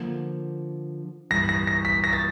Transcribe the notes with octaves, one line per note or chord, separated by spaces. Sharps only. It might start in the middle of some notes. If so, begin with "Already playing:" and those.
Already playing: D3 F3 A#3
G2 E3 G3 A#6
A#6
A#6
B6
A#6
A6